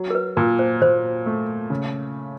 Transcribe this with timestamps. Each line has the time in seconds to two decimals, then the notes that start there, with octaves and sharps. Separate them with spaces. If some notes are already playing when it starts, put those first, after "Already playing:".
Already playing: F#3
0.10 A#4
0.15 B4
0.37 A#2 A#4
0.59 C5
0.82 A#2 C5
1.26 A3
1.70 C#3